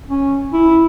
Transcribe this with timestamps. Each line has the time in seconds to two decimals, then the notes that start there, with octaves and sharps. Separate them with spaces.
0.09 C#4
0.53 E4